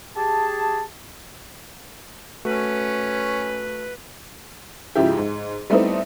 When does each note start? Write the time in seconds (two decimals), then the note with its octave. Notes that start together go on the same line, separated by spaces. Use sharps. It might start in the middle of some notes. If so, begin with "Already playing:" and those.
0.16 G4 G#4 A5
2.45 A3 C#4 F#4 B4
4.95 G#2 C#3 F3 D#4 E4 G4
5.17 G#2
5.70 G3 A3 B3 C4 D#4 E4